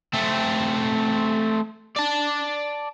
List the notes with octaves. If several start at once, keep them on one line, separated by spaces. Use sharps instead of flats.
A3 C4
D5 A5